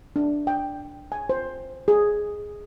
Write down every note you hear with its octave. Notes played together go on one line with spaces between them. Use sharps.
D4
G5
G#5
C5
G#4